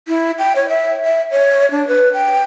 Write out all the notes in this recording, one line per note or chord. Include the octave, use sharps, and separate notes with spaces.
E4
G5
C#5
E5
E5
C#5
D4
B4
G5